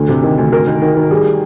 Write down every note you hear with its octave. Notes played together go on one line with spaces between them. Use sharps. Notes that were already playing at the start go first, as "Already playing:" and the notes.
Already playing: D2 D3
C3
D#3
D2
D2 A#4
D#3
D#3
D#3
G3 G#4